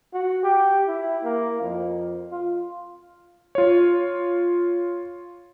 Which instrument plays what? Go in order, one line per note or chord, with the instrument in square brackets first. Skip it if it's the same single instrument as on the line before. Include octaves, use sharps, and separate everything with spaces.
[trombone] F#4
G4
E4
A#3
F2
F4
[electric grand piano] F4 C#5